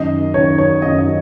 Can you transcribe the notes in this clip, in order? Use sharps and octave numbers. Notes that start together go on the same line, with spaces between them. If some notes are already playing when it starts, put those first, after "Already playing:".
Already playing: F#2 D#3 D#5
F#2 D#3 C#5
C#5
F#2 D#3 D#5
D#5